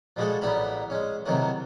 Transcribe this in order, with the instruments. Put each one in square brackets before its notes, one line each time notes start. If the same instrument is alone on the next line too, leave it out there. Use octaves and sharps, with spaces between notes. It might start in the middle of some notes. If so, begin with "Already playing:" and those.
[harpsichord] F3 G3 G#3 F#4 G#4 A4
A1 G3 B3 E4 A#5 B5
G#3 C#4
C3 D#3 E3 F#3 A3 F#4